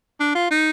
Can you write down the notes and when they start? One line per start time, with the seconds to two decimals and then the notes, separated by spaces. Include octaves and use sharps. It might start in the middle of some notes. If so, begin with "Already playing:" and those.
0.20 D4
0.35 F4
0.50 D#4